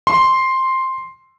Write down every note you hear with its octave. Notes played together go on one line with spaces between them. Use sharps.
C6